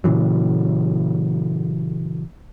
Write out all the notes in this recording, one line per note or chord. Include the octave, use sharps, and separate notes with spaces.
A#2 C#3 E3 F#3